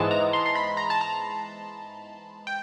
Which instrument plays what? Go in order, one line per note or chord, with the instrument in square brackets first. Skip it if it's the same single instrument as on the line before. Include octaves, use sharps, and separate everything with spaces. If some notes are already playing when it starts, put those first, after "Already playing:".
Already playing: [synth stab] G#2 E3 G#3 B3 A5
A#5
C6
C6
B5
A#5
A5
A#5
G5